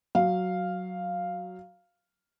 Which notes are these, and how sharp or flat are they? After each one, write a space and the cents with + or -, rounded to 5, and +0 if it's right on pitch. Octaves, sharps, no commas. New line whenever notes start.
F#3 +0 F5 +0